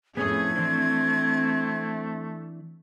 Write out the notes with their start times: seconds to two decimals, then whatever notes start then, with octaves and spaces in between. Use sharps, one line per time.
0.17 F2 A2 A3 B3 C#4 G#4 A4 G#6
0.56 E3 C4 D4